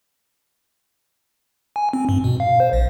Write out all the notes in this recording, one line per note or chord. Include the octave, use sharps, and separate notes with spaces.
G#5
C4
G2
B2
F5
C5
A#1